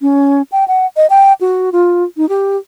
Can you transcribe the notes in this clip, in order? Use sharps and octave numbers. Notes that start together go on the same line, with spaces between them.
C#4
G5
F#5
D#5
G5
F#4
F4
D#4
G4